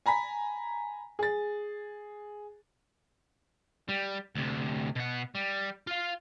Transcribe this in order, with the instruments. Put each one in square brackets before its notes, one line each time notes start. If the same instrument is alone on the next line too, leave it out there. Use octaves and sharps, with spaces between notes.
[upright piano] G#5 A#5 B5 B6
G#4 A6
[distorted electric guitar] G3
D2 C3
B2 F#5
G3
F4 F5